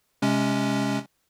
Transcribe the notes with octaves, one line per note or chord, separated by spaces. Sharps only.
C3 G#3 C#4